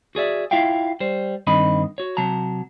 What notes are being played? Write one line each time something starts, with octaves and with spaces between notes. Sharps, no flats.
F#4 G#4 D5 E5
E4 F4 E5 F5 G5
G3 C5
G2 D#3 C4 D#5 B5
F#4 C#5
C3 F#3 A5 A#5